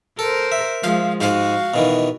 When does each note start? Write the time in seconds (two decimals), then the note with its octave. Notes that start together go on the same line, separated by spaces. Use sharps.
0.19 A4 A#4 C5
0.52 E5
0.83 F3 G#3 F5
1.21 G#2 G#3 F#4 F5
1.74 B2 D#3 E3